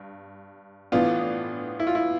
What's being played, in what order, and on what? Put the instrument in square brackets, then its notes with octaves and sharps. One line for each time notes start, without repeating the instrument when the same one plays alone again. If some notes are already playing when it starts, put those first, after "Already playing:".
Already playing: [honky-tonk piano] G2
[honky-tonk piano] A2 E3 B3 D4 [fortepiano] F4
[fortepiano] E4
F4
E4